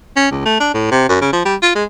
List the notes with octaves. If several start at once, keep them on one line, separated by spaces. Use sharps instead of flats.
C#4
C#2
A3
D4
A2
C3
F#2
C#3
F3
G3
F4
G#3